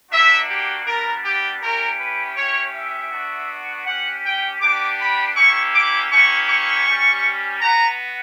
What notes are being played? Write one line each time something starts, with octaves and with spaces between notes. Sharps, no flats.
A#3 D4 F#4 E5
G4
G3 B3 D4 A#4
G4
C#4 E4 G4 A#4
B4
C#4 E4 G4 C#5
E5
B3 D4 F#4
C#4 G4 F#5
G5
B3 D4 G4 D6
B5
A#3 C#4 E4 G4 C#6
D6
A#3 C#4 E4 G4 C#6
C#6
G3 C#4 G4
B3 F#4 A#5